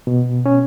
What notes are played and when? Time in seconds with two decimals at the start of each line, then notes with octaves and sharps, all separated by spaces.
0.07 B2
0.46 C#4